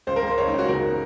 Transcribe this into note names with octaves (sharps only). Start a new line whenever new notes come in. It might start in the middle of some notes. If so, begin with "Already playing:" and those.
C#2 C5
A#4
C#2 C5
C#2 C#5
D#4
C#2 F#4
C#3 A#4